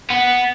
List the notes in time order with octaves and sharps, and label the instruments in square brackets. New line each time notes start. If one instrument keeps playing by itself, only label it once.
[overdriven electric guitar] B3